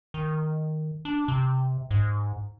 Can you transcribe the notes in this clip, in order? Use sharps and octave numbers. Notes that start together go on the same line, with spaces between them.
D#3
D4
C3
G#2